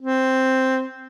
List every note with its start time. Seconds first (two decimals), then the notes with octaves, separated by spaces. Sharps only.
0.01 C4